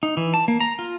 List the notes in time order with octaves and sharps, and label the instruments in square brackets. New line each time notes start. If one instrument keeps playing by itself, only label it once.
[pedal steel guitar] D#4
E3
A5
A#3
A#5
F4